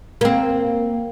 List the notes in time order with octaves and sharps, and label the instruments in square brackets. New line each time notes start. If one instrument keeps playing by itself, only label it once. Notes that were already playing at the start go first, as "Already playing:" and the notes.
[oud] A#3 C4